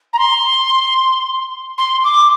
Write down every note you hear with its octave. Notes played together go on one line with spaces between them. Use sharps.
A#5
C6
C6
D6